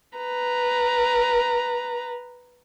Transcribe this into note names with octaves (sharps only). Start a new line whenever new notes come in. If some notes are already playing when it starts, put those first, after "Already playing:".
B4 A#5